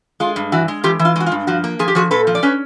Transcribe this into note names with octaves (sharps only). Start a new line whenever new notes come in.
G#3 F4
G2
E3 F#4
G#3
E3 F4 G4
E3
F4
G#3 F#4
F4
G2
F3 F#4
A#3
F3 G#4
G4
F3 F#4 G#4
A#2 A4 B4
F3
D5
C#4 B4 C#5